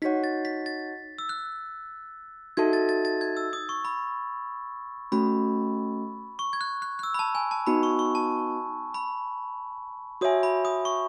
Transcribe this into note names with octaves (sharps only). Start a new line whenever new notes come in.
D#4 F#4 C#5 F#5 B6
A6
B6
A6
E6
F#6
D#4 F#4 A4 E5 A5 G#6
A6
A6
A6
G#6
E6
D#6
C#6
B5
A3 C#4 F#4 B5
C#6
G#6
F#6
F#6
F#6
E6
B5
A5
G#5
A5
B3 D#4 F#4 B5
C#6
C#6
A5
B5
F#4 C#5 E5 G#5 D#6
B5
D#6
C#6